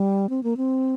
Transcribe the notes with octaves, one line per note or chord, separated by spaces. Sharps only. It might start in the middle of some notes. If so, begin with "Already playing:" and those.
Already playing: G3
C4
A#3
C4